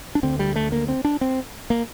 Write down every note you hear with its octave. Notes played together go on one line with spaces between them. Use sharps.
D4
D2 D3 C4
G3
A3
A#3
C4
D4
C4
A#3